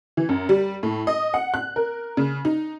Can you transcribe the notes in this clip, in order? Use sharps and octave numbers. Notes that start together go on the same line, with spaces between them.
E3
F#2
G3
A2
D#5
F#5
F#6
A#4
C#3
D#4